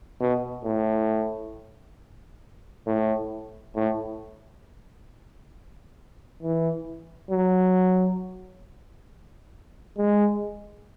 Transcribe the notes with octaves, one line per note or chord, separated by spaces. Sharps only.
B2
A2
A2
A2
E3
F#3
G#3